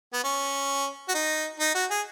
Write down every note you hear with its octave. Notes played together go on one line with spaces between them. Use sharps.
B3
C#4
F#4
D#4
D#4
F#4
G#4